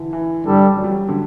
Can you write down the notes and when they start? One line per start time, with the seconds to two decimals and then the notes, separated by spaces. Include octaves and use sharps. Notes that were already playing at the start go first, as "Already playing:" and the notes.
Already playing: D3 E3
0.13 E3
0.45 G2 D3 G3 D4 A4
0.77 F#3
0.84 G3
0.91 F#3
1.09 D3